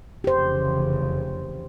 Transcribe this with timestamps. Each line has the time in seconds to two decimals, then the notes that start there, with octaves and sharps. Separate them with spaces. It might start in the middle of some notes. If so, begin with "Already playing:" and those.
0.24 F1 C#3 E3 G4 C5